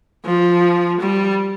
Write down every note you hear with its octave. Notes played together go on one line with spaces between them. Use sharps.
F3
G3